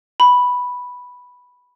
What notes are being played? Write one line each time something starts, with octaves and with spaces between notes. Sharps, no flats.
B5